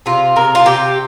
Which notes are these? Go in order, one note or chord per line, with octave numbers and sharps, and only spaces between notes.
C3 F4
C3 A#4
F4
C3 G4